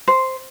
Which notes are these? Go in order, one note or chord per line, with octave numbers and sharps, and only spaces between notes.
C5